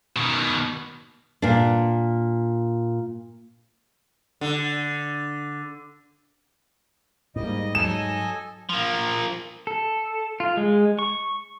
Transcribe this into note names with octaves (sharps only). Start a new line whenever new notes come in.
B2 D#3
A#2 D4
D3
G#2 G3 A#3 D#5
F#3 A4 D#5 G#5 E7
F3 A#3
A4
F4
G#3
C#6